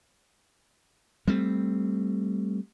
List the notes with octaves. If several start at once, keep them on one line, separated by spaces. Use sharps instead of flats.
G3 A3 C4